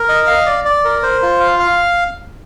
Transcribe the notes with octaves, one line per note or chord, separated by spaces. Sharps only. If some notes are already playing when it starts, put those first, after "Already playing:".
Already playing: A#4
D#5
F5
D5
D5
A#4
C5
F4
F5
F5